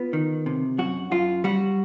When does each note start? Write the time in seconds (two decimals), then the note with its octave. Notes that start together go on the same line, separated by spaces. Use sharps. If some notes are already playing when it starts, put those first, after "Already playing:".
Already playing: B3 F4
0.13 D#3
0.46 C3
0.78 F#2 F#4
1.11 F#2 F4
1.44 G3 F#4